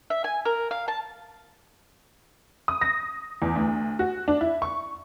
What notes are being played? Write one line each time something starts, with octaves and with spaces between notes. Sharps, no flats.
E5
G#5
A#4
F5
A5
D#6
A#6
E2
D2
F#4
D4
E4
C#6